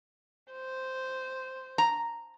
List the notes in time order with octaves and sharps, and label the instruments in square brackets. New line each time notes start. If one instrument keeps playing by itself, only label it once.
[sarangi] C5
[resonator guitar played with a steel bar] A#5